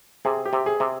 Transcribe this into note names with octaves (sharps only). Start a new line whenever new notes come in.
C3 G#4
G4
C3
G#4
C3